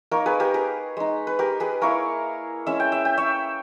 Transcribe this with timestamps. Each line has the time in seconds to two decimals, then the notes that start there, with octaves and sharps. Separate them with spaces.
0.11 A#3 D#4 A#4 C#5
0.26 G#4 B4
0.40 G4 A#4
0.54 G#4 B4
0.97 G#3 D#4
1.27 B4
1.39 G4 A#4
1.60 G#4 B4
1.82 A#3 E4 A#4 C#5
2.67 G#3 C#4 E4 E5
2.80 G5
2.92 E5
3.05 G5
3.17 C#5 E5